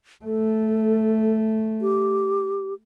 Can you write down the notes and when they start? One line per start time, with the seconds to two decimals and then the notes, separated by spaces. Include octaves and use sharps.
0.25 A3 A4
1.82 G4